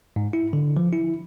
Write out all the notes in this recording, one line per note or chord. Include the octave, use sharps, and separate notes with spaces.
G#2
E4
D3
F3
E4